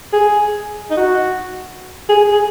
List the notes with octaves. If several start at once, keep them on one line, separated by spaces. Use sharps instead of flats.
G#4
D#4
F#4
G#4
G#4